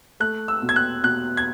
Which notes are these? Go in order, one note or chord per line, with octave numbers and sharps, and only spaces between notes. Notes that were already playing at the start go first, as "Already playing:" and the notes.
A3 F#6
E6
B2
G#6
F#6
B2 F#6
G#6